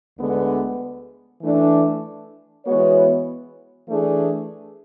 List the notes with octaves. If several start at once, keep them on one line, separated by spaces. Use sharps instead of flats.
D2 D3 G#3 B3
E3 A3 D4
E3 G#3 B3 F#4 C#5
E3 A3 D4 G#4